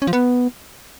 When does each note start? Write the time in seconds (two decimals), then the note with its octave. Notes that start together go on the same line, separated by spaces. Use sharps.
0.02 C#4
0.07 F3
0.13 B3